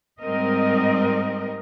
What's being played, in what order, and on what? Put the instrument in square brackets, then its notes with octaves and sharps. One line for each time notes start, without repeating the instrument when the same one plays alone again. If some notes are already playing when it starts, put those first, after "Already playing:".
[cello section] G#2 G3 C4 A#4 D#5